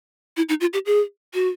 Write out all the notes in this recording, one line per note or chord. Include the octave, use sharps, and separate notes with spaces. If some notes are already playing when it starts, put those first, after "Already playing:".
E4
D#4
F4
G4
G#4
F#4